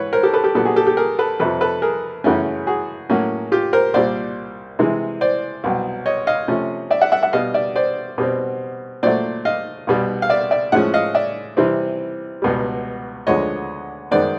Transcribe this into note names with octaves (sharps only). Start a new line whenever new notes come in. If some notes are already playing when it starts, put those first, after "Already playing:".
Already playing: G#2 E3 B4 C#5
A#4 C5
G4 A4
A4 B4
G4 A4
A#2 F#3 B3 G4 A4
F#4 G#4
G4 A4
G4 A4
G#4 A#4
A4 B4
F2 C3 F3 A4 B4
A4 B4
G#4 A#4
F#2 C#3 E3 A3 C#4
F#4 G#4
A2 F#3 A#3 C#4
F4 G4
A#4 C5
C2 A#2 G3 C5 D5
C3 E3 G#3
C5 D5
C2 B2 F#3
C#5 D#5
D#5 F5
C3 F3 A3 C#4
D5 E5
E5 F#5
E5 F#5
E5 F#5
B2 G3 B3 D#5 F5
D5 E5
C5 D5
B2 G3 C4
A#2 F#3 A3 C5 D5
D#5 F5
C2 B2 G3
F5
D5 E5
D5 E5
A2 F3 G#3 C#4 E5 F#5
D#5 F5
D5 E5
C3 E3 G3 C4
C#2 B2 G3
D2 D3 F3 G#3 B3 C#5 D#5
F#2 D#3 G#3 B3 C5 D5